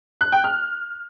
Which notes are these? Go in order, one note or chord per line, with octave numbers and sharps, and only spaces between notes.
F#6
G5
F6